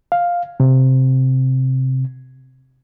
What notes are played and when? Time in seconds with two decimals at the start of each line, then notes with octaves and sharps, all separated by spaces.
0.12 F5
0.60 C3